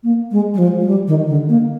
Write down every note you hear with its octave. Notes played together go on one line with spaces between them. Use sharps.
A#3
G#3
G3
F3
G#3
G3
D#3
D3
A#3